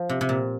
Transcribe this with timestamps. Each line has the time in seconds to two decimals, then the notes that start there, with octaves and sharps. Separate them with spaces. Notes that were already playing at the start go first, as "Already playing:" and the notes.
Already playing: F3
0.09 C3
0.21 C3
0.29 A#2